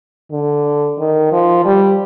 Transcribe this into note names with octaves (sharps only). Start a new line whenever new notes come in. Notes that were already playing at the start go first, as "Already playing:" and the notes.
D3
D#3
F3
G3